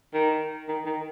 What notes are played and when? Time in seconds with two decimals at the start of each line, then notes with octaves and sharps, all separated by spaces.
0.14 D#3
0.69 D#3
0.86 D#3